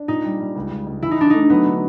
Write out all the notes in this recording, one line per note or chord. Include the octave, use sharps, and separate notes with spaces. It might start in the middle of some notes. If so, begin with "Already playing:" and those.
Already playing: D4
A#2 D#4
G3
G3
C#2
C#2
C#2
E3 E4
D#4
E3 D4
A3 D#4
F#3 B3
D3